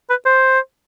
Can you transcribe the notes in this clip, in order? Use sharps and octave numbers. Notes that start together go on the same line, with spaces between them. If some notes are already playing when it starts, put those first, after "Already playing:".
B4
C5